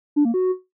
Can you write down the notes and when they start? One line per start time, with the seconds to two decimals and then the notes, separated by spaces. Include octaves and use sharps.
0.16 D4
0.25 A#3
0.34 F#4